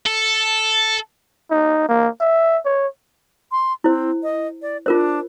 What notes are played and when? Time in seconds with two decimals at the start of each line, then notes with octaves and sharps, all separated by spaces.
0.06 A4
1.51 D#4
1.89 A#3
2.20 E5
2.65 C#5
3.52 C6
3.84 C4 E4 C5
4.23 D#5
4.62 D5
4.86 D4 F4 A#4 C5